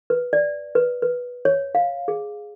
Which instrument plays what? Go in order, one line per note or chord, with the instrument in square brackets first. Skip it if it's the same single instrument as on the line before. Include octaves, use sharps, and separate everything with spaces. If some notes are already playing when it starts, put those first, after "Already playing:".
[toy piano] B4
D5
B4
B4
C#5
F5
G#4